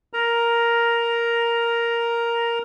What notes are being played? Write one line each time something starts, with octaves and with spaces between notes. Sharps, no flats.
A#4 A#5